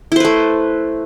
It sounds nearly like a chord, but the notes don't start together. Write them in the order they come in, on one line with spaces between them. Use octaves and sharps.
E4 C5 B4 A3